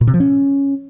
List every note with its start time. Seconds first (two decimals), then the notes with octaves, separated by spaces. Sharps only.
0.01 A#2
0.07 C3
0.14 F3
0.20 C#4